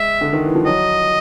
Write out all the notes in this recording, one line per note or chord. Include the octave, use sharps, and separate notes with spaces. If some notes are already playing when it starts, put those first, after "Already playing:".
Already playing: G#3 E5
D3
D#3
E3
F3
F#3 D#5